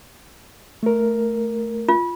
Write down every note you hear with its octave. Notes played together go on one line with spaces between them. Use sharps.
A3 A#4
F4